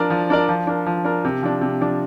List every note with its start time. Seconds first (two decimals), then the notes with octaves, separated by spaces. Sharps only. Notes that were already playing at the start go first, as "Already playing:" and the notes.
Already playing: F3 D4 A#4 D5
0.10 F3
0.30 D4 A#4 D5
0.49 F3
0.67 D4 A#4
0.86 F3
1.05 D4 A#4
1.25 C3
1.42 F3 D4
1.61 C3
1.81 F3 D4